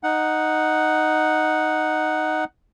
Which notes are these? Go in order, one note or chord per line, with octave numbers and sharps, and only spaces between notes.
D#4 F#5